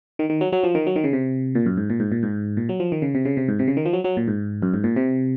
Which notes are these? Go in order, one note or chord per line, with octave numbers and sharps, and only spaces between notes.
D#3
D#3
F#3
F#3
F3
D#3
F#3
D#3
C#3
C3
A#2
F#2
G#2
A#2
G#2
A#2
G#2
A#2
F#3
F3
D#3
C#3
C3
C#3
C3
G#2
C3
C#3
D#3
F3
F#3
F#3
A#2
G#2
F#2
G#2
A#2
C3